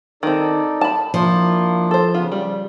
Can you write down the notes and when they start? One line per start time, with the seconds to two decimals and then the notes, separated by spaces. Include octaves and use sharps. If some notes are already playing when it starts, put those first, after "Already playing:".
0.23 D#3 C4 D#4 A4 D5
0.81 A5 B5
1.14 F3 A#3 D4 E4
1.91 A4 C5
2.14 C#3 B3 F4
2.32 G3